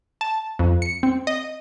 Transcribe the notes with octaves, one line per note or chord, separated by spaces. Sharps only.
A5
F2
C#7
C4
D#5